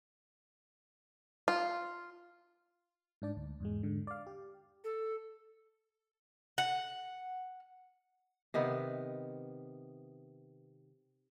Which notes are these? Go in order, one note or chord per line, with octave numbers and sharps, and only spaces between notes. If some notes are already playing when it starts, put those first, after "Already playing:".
F4
G#2 D4 D5
D2
E2 G#2 G#3
G#2 D3
D5 F5
G4
A4
F#5
C3 D#3 B3